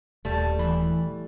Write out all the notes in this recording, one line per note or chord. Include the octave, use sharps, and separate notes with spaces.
D#1 G3 A3
E3 B5